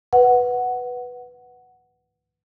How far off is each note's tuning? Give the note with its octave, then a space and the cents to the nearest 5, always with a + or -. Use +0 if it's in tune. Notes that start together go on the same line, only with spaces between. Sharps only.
B4 +0 F#5 +5